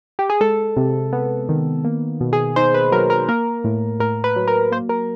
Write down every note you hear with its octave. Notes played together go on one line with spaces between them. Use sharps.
G4
G#4
G#3 A4
C3
B3
D#3
A#3
B2
G#4
D#4 C5
B4
F#3 A#4
A#4
A#3 A#4
A2
A2 A#4
B4
F#3
A#4
A#3 C5
A#4